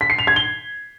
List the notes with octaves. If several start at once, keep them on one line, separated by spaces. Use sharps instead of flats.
B6
C7
F7
G#6
G7